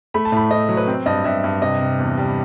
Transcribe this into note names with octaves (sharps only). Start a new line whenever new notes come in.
A3 B5
A5
A2 B5
A2 D#5
F#3
B4
C4 C5
G2 D#5
G2 E5
G2
C3 D#5
C3
E2
G3